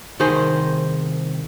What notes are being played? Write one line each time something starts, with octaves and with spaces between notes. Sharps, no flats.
C2 D#3 D#4 G#4 C5